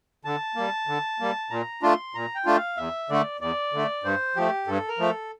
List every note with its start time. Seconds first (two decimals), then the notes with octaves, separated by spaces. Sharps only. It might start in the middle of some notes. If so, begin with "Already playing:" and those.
0.25 D3 A5
0.55 G3 A#3
0.87 D3
1.20 G3 A#3
1.50 A#2 A#5
1.83 A3 D4 F4 C6
2.15 A#2 A#5
2.35 G5
2.45 A3 D4 F4
2.56 F5
2.77 E2 E5
3.10 D3 A3 D5
3.41 E2 D5
3.73 D3 A3
4.04 G2 C5
4.36 F3 A3 G4
4.67 G2 A4
4.88 A#4
4.99 F3 A3
5.09 A4